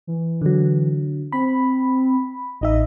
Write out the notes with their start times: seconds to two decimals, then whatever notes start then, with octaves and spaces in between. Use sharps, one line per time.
0.07 E3
0.41 D3 F#3
1.32 C4 B5
2.61 A1 D#4 D#5 E5